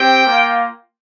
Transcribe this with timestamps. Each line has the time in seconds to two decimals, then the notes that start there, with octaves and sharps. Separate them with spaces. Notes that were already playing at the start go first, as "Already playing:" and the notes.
Already playing: C4 G4 G5
0.27 A#3 F4